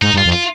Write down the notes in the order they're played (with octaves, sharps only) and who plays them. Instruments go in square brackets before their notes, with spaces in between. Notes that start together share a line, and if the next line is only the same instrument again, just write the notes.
[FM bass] G#2 [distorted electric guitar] D#4
[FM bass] G2
[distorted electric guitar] F4
[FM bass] F2
[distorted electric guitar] F4